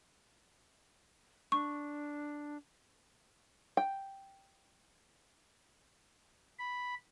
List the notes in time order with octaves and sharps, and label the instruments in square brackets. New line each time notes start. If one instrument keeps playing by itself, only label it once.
[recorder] D4 [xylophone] C#6
[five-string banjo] G5
[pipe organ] B5